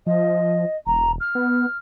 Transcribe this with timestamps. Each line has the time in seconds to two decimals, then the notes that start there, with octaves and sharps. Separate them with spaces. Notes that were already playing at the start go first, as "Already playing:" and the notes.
0.06 F3 D#5
0.86 E1 A#5
1.20 F6
1.35 B3